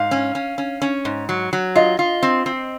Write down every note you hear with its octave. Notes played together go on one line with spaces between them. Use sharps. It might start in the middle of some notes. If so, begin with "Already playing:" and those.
Already playing: G#2 F5
C#4
C#4
C#4
C#4
G#2
F#3
F#3
F4 D#5
F4
C4
C4